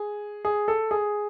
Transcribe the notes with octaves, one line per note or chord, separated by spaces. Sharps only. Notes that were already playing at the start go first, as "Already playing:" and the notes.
Already playing: G#4
G#4
A4
G#4